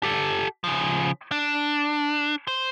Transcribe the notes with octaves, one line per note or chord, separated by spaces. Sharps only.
G4 A4
C#3 F3
D4
C5 C6